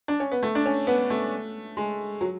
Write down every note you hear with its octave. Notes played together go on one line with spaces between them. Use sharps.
D4
C#4
B3
A3
D4
C#4
B3
A3
G#3
F#3